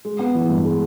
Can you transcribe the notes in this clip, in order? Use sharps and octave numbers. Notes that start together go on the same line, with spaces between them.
G#3
B3
E3
G2
G#3